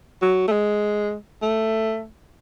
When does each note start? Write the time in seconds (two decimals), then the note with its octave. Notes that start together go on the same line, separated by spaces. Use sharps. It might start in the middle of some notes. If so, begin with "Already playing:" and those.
0.22 F#3
0.48 A3
0.52 G#3
1.42 A3